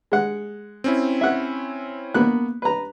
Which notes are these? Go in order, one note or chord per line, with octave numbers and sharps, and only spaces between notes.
G#3 F#5
C4 C#4 E4
E5 F#5
A#3 B3 F#6
B4 A#5